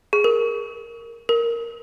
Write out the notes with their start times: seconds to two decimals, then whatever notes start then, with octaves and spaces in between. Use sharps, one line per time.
0.13 G#4
0.24 A#4
1.29 A#4